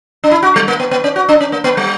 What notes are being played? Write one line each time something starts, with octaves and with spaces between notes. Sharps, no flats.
D4
E4
F#4
G3
A#3
B3
B3
C#4
F#4
D4
C#4
A#3
B3
G3